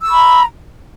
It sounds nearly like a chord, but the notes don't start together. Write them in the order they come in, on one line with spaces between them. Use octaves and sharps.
E6 C#6 B5 A#5